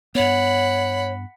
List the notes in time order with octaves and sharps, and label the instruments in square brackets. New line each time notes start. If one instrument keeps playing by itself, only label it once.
[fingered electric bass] G2 B3 [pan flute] C#5 [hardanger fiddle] F#5 B5